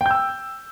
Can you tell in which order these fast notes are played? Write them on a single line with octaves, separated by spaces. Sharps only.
G5 G6 E6